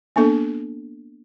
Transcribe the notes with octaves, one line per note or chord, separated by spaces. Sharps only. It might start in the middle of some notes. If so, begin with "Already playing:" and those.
A#3 B3 D4 A4